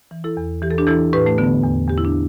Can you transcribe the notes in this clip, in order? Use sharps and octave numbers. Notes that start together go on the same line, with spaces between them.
E3
E4 A4
E2
E3 G4
A4
D4 G4
E3 E4 A4
A2 G4 B4
A3
D3 B3
E2
E2 G4
E4
D4